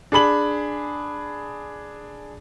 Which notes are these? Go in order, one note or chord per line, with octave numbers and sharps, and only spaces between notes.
D4 G#4 B5 F#7